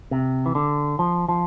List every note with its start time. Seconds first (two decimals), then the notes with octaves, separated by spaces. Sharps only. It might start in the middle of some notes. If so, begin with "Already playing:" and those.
0.11 C3
0.46 E3
0.55 D3
0.99 F3
1.29 F3